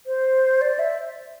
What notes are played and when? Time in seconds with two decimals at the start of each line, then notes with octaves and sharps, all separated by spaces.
0.06 C5
0.61 D5
0.79 E5